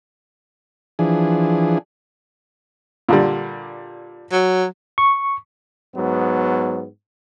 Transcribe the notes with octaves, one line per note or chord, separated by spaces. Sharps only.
E3 F3 D4 G#4
A#2 D3 G3
F#3
C#6
G#2 F#3 B3